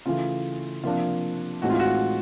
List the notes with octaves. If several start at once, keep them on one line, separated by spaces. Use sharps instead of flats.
C#3 E3 A3 F4
C3 F3 A#3 D4 F4
A2 E3 G#3 C4 D#4 F#4
F4
F#4